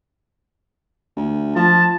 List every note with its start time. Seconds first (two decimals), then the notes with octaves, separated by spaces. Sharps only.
1.16 D2
1.56 F3 A5